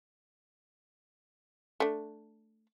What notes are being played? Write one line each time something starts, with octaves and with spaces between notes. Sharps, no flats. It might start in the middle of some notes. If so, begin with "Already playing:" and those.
A3 D4